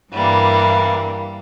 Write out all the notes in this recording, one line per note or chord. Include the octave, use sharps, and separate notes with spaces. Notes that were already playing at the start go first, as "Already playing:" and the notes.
G2 E3 G3 A#3